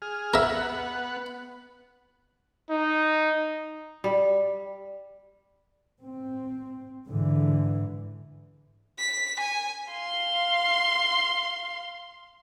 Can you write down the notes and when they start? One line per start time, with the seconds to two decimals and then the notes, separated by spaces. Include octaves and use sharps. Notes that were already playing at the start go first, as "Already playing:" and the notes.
0.02 G#4 F6
0.34 B3 A#4 E5 F#5
2.70 D#4
4.04 G3
6.02 C4
7.09 G#2 D3 E3
8.98 B6
9.39 G#5
9.91 F5 C6